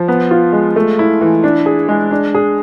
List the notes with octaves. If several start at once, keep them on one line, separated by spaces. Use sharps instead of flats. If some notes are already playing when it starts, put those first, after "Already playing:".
Already playing: F3
B3
F4
G#3
A3
E4
E3
D4
G#4
G#3
D4
G#4